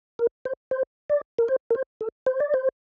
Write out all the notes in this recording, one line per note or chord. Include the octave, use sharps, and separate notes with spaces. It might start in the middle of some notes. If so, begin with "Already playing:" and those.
A#4
C5
C5
D5
A#4
C5
A#4
C5
A4
C5
D5
C5